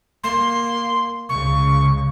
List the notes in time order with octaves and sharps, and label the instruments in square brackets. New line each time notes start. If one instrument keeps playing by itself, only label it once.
[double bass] A#3 [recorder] C6
[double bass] C#2 C#3 [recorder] C#6